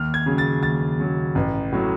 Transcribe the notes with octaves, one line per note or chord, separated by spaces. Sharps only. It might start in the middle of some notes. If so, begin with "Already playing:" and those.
Already playing: D#2 F6
G#6
C#3 F#3
A6
D#2 A6
C#3 F#3
A1
A2 F#3